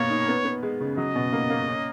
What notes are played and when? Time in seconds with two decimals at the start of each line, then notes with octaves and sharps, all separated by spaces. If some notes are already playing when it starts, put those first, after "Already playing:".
Already playing: B2 A#3 A#4 C#5
0.10 D#4
0.28 B3
0.45 B3
0.63 G#3
0.80 C#3
0.97 F#3 D#5
1.15 B2
1.32 A#3
1.50 A#3
1.68 C#4